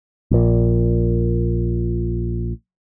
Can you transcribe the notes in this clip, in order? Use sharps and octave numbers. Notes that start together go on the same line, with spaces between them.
A#1 A#2